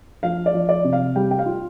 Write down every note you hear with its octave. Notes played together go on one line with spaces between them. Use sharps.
F3 F5
D5
F3
D5
C3
F5
G3 G5
G5
F5
F4